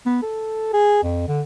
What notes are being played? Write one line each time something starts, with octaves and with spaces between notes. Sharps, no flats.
B3
A4
G#4
F2
D3